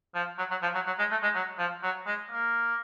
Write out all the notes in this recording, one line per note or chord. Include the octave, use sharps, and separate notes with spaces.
F3
F#3
F#3
F3
F#3
F#3
G#3
A3
G#3
F#3
F3
F#3
G#3
A#3